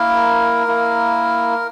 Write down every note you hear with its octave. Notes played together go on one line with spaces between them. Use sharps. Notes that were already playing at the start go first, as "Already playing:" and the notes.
Already playing: A#3 E4 A#4
A#3 E4